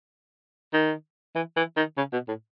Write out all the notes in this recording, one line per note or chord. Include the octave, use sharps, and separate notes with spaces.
D#3
E3
E3
D#3
C#3
B2
A2